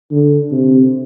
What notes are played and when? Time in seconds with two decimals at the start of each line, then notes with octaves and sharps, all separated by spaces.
0.11 D3
0.52 C3